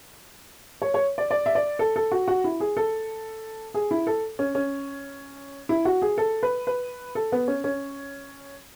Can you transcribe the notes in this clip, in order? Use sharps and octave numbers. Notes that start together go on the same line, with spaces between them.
C#5
C#5
D5
D5
E5
D5
A4
A4
F#4
F#4
E4
G#4
A4
G#4
E4
A4
C#4
C#4
E4
F#4
G#4
A4
B4
B4
A4
B3
C#4
C#4